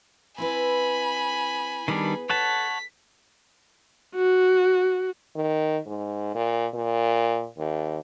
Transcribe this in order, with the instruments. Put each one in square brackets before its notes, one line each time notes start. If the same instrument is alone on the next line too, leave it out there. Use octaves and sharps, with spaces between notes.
[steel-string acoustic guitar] C4 E4 B4 [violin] G#5 B5
[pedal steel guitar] D#3 G3 D4 [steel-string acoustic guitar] B3 G#4
[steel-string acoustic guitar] A4 [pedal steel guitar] C#5 F#5 A5 [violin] B6
[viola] F#4
[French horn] D#3
G#2
A#2
A#2
D#2